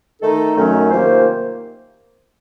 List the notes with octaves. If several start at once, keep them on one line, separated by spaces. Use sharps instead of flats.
D#3 A3 D#4 A4
F#2 D#3 F#3 A3 C#4
C3 D#3 A#3 F4 C5